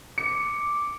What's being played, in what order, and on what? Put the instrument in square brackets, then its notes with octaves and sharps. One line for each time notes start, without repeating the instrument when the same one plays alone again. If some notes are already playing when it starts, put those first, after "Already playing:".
[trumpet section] D6 [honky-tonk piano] C#7